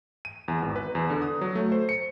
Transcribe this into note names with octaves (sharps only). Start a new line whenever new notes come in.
D#7
E2
G#1
B4
E2
D3
D#6
F#3
A3
C5
C#7